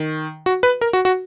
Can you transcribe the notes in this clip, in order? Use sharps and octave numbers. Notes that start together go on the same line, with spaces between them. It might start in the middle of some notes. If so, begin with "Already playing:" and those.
Already playing: D#3
F#4
B4
A#4
F#4
F#4